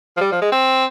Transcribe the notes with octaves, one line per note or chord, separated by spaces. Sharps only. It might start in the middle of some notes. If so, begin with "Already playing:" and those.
F3
G3
F3
G#3
C4